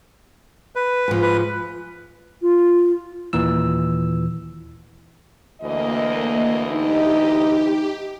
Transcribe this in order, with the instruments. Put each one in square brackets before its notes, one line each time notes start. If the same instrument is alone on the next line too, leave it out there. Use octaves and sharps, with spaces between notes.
[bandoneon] B4
[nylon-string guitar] G#2 F3
[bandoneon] B4
[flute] F4
[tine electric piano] D#2 A#2 E3 E6
[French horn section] D2 E3 D#5 [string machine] A#3
[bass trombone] D#4 [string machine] G4